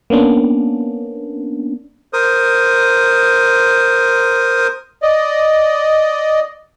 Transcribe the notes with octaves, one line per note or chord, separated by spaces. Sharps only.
A#3 B3 C#4 D4
A#4 C5 D#6
D5 D#5